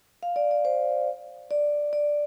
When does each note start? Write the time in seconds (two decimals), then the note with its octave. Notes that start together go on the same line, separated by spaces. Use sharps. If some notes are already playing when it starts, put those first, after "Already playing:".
0.23 F5
0.36 D5
0.51 D5
0.65 C5
1.51 D5
1.93 D5